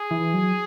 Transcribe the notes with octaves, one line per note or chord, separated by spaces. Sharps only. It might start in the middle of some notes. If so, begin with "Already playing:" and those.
Already playing: G#4
E3
F#3